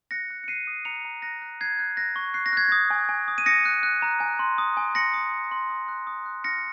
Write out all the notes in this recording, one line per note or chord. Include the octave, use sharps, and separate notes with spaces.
F#6 A#6 C#7
F#6
C#7
F#6 C7 D#7
D#6
A#5 C#7 F7
A#5
F#6 A#6
F#6
F#6 G#6 C7
F#6
F#6 A#6
C#6
F#6 C7
A#6
F#6 G#6
D#6 A#6
G#5
G#5
D#6
D#7
D#6 A#6 C#7
F#6
F#6
A#5
G#5
C6
D#6
G#5
C6 A#6 C#7
D#6
D#6
C6
D#6
F#6
D#6
F#6
F6 A#6 C#7